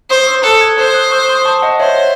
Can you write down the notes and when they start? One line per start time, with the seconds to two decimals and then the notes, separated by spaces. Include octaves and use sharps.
0.10 C5 C6 D#6
0.26 C#6 E6
0.44 A4 D#6 F#6
0.61 E6 G#6
0.78 C5 D#6 F#6
0.94 D#6 F#6
1.11 C#6 E6
1.29 C6 D#6
1.45 A5 C#6
1.62 D#5 F#5
1.80 C5 C#5 E5